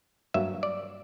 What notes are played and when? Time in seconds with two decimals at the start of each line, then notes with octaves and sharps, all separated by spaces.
0.34 G2 F#3 A#3 E5
0.63 D5